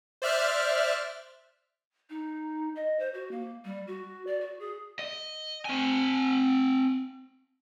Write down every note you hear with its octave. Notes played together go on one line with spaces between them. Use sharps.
C5 D5 E5 F6 F#6
D#4
D#5
C5
F#4
A#3
G3
F#4
D5
F#4
G#4
D#5
C4 G#5